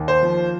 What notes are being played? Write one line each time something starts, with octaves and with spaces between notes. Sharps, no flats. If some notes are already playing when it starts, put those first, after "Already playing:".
Already playing: D#2
C5
F3